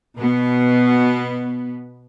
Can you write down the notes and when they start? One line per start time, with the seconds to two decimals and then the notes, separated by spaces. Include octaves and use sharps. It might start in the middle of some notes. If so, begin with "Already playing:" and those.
0.18 B2 B3